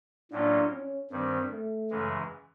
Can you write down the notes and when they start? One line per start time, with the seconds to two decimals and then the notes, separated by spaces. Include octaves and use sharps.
0.31 A2 F#3 A#3 C#4 D4 F4
0.71 C#4
1.11 G2 D#3 G3 C4
1.50 A3
1.90 F#2 C#3 E3 G#3